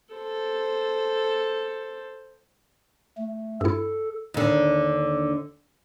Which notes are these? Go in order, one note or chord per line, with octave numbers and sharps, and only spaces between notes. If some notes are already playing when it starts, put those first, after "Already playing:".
A4 C5
A3
G2 E4 A4
D#2 D3